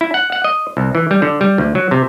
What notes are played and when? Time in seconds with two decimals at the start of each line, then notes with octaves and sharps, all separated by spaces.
0.01 E4
0.14 F#5
0.32 F#5
0.44 D#5
0.77 C2
0.95 E3
1.11 G3
1.22 D3
1.41 G3
1.58 D2
1.75 F#3
1.91 C3